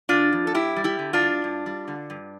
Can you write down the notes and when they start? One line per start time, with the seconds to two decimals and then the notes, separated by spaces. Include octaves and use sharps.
0.09 D3 D4 F4
0.32 F2
0.47 A4
0.54 G2 E4 G4
0.76 G3
0.84 E4 G4
0.99 D3
1.13 D4 F4
1.22 G2
1.44 G2
1.66 G3
1.88 D3
2.10 G2